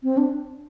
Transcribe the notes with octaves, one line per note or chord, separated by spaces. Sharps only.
C4
D4